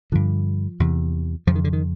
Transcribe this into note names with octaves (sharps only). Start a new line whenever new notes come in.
G2 D3 F3
E2 C3
F2 C#3 F3
D#3
D3
D#3